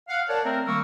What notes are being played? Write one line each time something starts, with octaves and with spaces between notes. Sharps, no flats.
F5 F#5
A#4 C#5 D5 F#5 A5
A3 C4 A#4
D#3 G3 A#3 A#4 C#6 E6